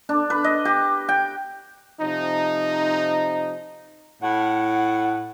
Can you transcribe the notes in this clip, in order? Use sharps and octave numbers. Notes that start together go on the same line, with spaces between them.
D4
B4
D#5
G4
G5
C3 F3 D#4
A2 F#5